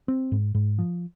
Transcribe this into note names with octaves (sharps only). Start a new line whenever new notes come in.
C4
G#2
G#2
F3